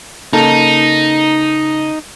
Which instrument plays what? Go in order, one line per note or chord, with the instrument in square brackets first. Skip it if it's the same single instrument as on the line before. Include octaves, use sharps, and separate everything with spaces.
[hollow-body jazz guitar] C#3 A#3 A4 [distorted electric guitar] D#4